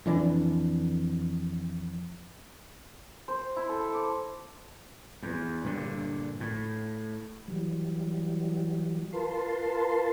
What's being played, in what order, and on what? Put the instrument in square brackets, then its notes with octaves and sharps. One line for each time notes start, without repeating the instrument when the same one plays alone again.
[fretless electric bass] F2 E3 D4
[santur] C5
E4
A4
D6
[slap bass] E2
G2 A#2 D3
A2
[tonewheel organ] E3 F#3 G3
F4 A#4 B4 A5 C6